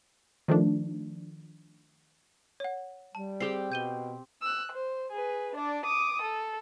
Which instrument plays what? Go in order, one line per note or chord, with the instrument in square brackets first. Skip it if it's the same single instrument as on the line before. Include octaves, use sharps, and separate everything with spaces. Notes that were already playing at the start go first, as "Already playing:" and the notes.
[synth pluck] D#3 F3 A3 D4
[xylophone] C#5 F#5
[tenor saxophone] G3 [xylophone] A5
[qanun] C4 G4 G5 [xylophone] G#4 C7
[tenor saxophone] B2 [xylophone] G6 D#7 G7
[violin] E6 F#6
C5
G#4 B4
D4 D5
D6 D#6
A4